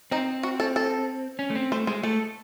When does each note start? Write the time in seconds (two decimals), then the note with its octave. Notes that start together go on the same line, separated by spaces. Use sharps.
0.11 C4 D#4
0.43 F#4
0.60 A4
0.76 A4
1.39 C#4
1.50 A3
1.55 C4
1.72 A3 C5
1.87 G#3 C5
2.03 A3 A4